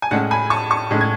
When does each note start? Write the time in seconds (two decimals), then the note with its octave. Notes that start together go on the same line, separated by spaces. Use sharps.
0.02 G#5
0.11 A2 G#3 C#4 F#5 A5
0.31 G#5 B5
0.50 A5 C#6
0.70 A5 C#6
0.91 A2 G#3 C#4
1.01 G#6